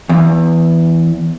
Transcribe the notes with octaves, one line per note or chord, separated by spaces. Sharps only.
E2